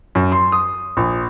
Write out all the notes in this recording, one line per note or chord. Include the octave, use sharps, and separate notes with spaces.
F#2
C6
D#6
A#1